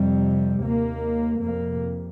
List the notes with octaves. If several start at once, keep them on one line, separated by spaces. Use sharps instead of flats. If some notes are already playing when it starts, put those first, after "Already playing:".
Already playing: F2 C3 G3
D#2 A#3
F2 C3 A#3